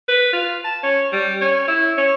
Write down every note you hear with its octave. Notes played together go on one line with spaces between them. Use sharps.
B4
F4
A5
C#4
G3
C#4
E4
C#4